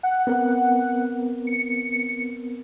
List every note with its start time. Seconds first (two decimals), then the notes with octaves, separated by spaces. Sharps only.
0.03 F#5
0.27 B3 C4 A#4
1.47 C#7